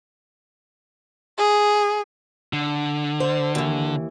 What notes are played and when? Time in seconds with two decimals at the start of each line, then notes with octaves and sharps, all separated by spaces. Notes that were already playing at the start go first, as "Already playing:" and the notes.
1.38 G#4
2.53 D3
3.20 C5
3.55 D#2 E3